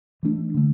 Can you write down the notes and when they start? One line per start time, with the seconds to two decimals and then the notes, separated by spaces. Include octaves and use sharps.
0.23 E3 A3 D4
0.54 D3 A3